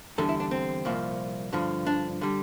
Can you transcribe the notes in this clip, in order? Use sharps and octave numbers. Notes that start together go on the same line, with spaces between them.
E2 D3 G3 A4
E4
D4
C4
C2 A#2 F3
G2 D3 F3
D4
D3 G3